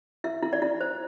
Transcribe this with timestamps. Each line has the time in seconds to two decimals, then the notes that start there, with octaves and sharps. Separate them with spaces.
0.24 E4 E5
0.43 E4
0.53 D5
0.62 E4
0.81 C5